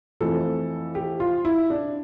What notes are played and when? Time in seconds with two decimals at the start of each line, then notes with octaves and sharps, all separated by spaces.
0.21 F2 E3 A3 A4
0.95 G4
1.20 F4
1.45 E4
1.70 D4